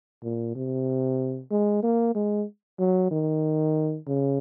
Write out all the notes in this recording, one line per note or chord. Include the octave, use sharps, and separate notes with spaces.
A#2
C3
G#3
A#3
G#3
F#3
D#3
C#3